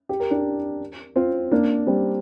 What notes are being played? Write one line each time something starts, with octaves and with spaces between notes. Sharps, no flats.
G4
A#4
D4 G4
C4 F4
A#3 D4
G3 C4